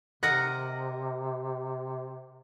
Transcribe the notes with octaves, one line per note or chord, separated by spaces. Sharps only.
C3 A#4 D#5 F#5 F#6 A#6 C#7